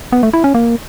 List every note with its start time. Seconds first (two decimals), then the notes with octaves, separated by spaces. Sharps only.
0.12 B3
0.23 A3
0.33 E4
0.44 C#4
0.54 A#3